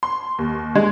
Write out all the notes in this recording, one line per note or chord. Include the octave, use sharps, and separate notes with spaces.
C6
D#2
G#3